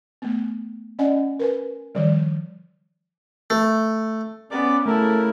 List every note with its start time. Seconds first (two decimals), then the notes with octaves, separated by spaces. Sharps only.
0.22 A3 B3
0.99 C#4 D5 D#5 F#5 G#5
1.40 A#4 B4 G#5
1.95 D#3 F3 G3
3.50 A3
4.51 B3 C#4 D5 D6
4.86 C#3 A3 E4 A4 A#4